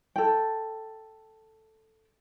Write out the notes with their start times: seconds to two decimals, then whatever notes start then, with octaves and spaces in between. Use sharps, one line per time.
0.16 A4 G5